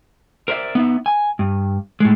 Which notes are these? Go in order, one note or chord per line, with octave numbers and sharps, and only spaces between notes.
A#4 C5 D5 E5
B3 D#4 E5
G#5
G2
A2 G#3